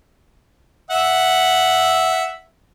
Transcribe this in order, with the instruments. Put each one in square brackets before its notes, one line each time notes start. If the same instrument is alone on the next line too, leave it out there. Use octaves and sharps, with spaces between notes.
[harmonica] E5 F#5